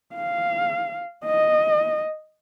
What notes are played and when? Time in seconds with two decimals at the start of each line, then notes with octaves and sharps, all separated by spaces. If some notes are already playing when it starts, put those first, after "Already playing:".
0.15 F5
1.25 D#5